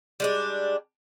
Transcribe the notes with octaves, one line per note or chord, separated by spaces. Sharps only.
G3 G#3 D4